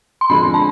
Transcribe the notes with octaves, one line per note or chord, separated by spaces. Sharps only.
C6
F2 D3 G#3 B5
A5